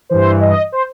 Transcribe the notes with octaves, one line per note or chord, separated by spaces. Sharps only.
G2 E3 C5
D#5
C5